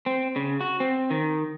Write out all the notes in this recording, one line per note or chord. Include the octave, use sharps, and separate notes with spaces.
C4
C#3
F#4
C4
D#3